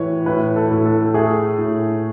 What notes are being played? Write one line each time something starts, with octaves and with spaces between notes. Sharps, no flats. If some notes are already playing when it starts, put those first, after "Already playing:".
Already playing: A2 E3 B4 C#5
A2 B4
A4
A2
A4
A3 G#4
A2